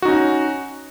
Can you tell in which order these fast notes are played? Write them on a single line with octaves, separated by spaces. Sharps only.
F#4 D#4 C#4